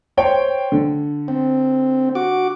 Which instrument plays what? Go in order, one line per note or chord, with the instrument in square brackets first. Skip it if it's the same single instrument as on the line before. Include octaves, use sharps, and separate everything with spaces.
[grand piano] C5 C#5 G5
D3
[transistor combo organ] C4
F#4 D6